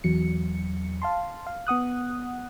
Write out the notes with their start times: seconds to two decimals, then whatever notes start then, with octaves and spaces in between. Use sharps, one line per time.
0.04 E2 F#3 C#7
1.02 F5 A5 C6
1.47 F5
1.67 B3 F#5 D#6 F#6